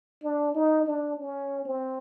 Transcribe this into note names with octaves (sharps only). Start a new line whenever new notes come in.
D4
D#4
D4
C#4
C4